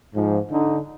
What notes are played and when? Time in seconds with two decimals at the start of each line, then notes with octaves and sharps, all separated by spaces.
0.14 G#2 F3
0.51 D3 D#4